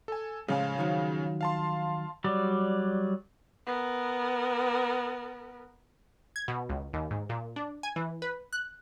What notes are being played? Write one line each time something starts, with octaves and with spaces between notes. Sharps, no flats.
A4 G#5
A2 C#3 F3 G#3 F5 G#5
D#3 F3 F#3
F5 A5 C6
F#3 G3 D5
B3 A#4
G#6
B2
C#2
D#2
G#2
A#2
D4
G#5
E3
B4
F#6